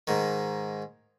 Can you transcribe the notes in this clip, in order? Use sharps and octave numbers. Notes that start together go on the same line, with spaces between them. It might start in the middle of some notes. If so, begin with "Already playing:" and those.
G#2 D#3